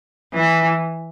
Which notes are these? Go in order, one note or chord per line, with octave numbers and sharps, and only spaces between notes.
E3